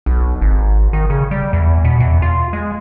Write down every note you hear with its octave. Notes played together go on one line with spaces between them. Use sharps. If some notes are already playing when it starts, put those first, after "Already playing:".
B1
G#1
D#3
C#3
G3
E2
B2
E2
F4
G#3